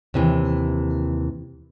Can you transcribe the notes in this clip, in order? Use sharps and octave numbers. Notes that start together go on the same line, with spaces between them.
D#2 C3 E3